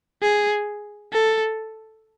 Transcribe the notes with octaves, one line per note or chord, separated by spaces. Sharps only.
G#4
A4